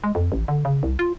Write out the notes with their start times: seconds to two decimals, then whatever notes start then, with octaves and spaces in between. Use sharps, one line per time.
0.04 G#3
0.15 F2
0.32 A1
0.48 D3
0.65 C#3
0.83 C2
0.99 F4